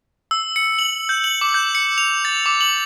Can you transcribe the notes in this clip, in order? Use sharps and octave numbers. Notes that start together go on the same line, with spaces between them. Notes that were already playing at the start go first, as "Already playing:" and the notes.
E6
C#7
F#7
G6
F#7
D6
G6
C#7
F7
A6
D6
F#7